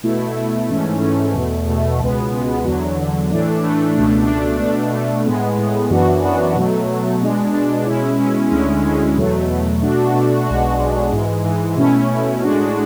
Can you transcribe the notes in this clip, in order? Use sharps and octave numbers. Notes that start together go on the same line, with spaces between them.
B2 A3 E4
B2 A3 E4
G#2 E3 A3 C#4
G#2 E3 A3 C#4
E2 B2 A3
E2 B2 A3
C#2 B2 G#3 B3
C#2 B2 G#3 B3
E2 D3 F#3
E2 D3 F#3
A2 E3 A3 D4
A2 E3 A3 D4
C#2 B2 A3 D4
C#2 B2 A3 D4
B2 A3 D4
B2 A3 D4
A2 G#3 B3
A2 G#3 B3
F#2 E3 B3 D4 F#4
F#2 E3 B3 D4 F#4
B2 F#3 A3
B2 F#3 A3
B2 G#3 D4
B2 G#3 D4
B2 G#3 C#4 E4
B2 G#3 C#4 E4
D2 D3 G#3 C#4 E4
D2 D3 G#3 C#4 E4
E2 B2 F#3 A3
E2 B2 F#3 A3
B2 A3 D4 F#4
B2 A3 D4 F#4
B1 B2 G#3 D4 F#4
B1 B2 G#3 D4 F#4
G#2 E3 G#3
G#2 E3 G#3
B2 A3 C#4 E4
B2 A3 C#4 E4
A2 G#3 D4 F#4